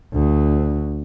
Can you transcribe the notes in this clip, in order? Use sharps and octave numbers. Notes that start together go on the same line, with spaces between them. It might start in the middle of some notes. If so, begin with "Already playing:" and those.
D2